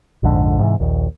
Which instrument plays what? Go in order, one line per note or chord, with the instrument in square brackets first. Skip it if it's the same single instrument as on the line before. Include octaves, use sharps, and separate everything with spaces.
[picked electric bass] A#1 F2 G#2 D3
G#2 C3 D#3 E3
A#1 D#2